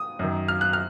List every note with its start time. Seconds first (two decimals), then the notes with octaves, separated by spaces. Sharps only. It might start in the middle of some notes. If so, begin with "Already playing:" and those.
Already playing: D#6
0.19 F#2 D#3
0.48 F6
0.61 F#6
0.73 F6